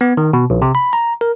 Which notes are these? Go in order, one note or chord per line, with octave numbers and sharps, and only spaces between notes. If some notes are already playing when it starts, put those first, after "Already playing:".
B3
D#3
B2
A#1
C3
B5
A#5
A#4